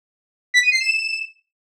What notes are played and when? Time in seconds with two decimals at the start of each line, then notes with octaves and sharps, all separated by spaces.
0.54 B6
0.63 D#7
0.72 C7
0.80 E7